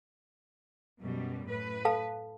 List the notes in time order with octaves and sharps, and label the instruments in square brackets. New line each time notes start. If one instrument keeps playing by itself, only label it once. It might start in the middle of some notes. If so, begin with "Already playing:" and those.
[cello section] F#2 B2 G3
A2 B4
[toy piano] A4 F5 A5